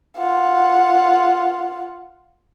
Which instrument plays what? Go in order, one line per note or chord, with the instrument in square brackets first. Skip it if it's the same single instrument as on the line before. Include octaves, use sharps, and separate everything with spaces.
[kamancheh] F4 F#5